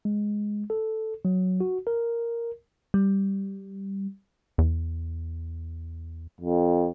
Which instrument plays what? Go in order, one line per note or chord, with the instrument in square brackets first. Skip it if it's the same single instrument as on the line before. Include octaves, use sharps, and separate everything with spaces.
[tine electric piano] G#3
A4
F#3
F#4
A#4
[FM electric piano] G3
[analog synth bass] E2
[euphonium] F2